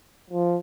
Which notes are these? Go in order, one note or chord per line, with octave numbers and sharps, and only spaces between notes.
F3